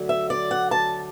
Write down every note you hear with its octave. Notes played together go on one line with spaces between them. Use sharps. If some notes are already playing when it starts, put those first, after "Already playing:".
Already playing: D2 D3 F#3
E5
D5
F#5
A5